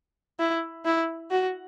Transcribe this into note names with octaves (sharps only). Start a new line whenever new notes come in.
E4
E4
F#4